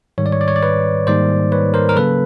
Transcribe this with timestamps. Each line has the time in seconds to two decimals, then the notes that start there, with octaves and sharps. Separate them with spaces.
0.18 G#2 D#3 G3 C#5
0.26 D5
0.32 C#5
0.41 D5
0.48 C#5
0.56 D5
0.63 B4 C#5
1.07 G#2 D#3 G3 A#3 D#4 C5 D5
1.52 B4 C#5
1.74 A#4 C5
1.89 A#4
1.96 C#3 F#3 A#3 C#4 A4 B4